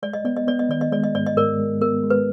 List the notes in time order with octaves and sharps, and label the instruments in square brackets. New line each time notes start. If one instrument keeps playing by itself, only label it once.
[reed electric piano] G#3 [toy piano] D5
[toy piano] D#5
[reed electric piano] B3 [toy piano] D5
[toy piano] D#5
[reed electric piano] B3 [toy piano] D5
[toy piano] D#5
[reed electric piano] D#3 [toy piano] D5
[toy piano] D#5
[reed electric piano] G#3 [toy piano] D5
[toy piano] D#5
[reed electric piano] G#2 [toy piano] D5
[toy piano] D#5
[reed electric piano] G#2 [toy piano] A#4 D5
[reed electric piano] G#3
[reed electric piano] B3 [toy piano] A#4
[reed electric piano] G#3
[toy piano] B4